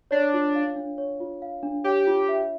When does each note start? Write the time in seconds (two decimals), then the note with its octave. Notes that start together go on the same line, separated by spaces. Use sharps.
0.11 D4 C#5
0.34 F4
0.55 F5
0.76 D4
0.98 C#5
1.20 F4
1.42 F5
1.63 D4
1.84 G4 C#5
2.07 F4
2.29 E5